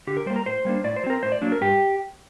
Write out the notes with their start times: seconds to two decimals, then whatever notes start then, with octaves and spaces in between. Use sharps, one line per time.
0.07 D3 G4
0.17 A#4
0.26 G3 A#3 C5
0.36 A#4
0.46 A2 C5
0.65 G3 A#3 D4
0.84 A2 D5
0.96 C5
1.03 F#3
1.06 C4 A#4
1.23 A2 C5
1.32 D5
1.42 F#3 A#3 D4
1.52 A#4
1.61 G2 G4